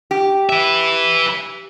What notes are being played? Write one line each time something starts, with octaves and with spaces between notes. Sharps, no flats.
G4
B4 E5